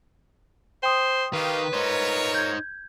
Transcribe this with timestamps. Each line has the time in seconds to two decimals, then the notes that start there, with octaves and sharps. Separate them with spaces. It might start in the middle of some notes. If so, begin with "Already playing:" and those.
0.83 C5 G5 C6 D#6
1.33 D#3 D#4 G4 B4 F5
1.73 D#4 F4 A#4 C5 C#5
2.34 G6 G#6